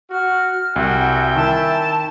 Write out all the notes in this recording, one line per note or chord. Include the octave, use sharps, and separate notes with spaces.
F#4 F6
C2 F#4 E5 G5 G#5
D#3 E4 A5